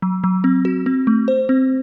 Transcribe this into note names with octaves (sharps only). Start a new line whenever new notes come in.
F#3
F#3
C4
F#4
C4
A3
C5
C4